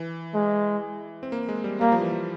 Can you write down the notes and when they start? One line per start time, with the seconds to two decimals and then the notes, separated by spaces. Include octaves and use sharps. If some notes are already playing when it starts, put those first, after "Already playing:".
Already playing: E3
0.34 G#3
1.23 C4
1.32 A#3
1.49 G#3
1.64 G3
1.81 G3 A#3
1.92 F3
2.01 E3
2.12 F3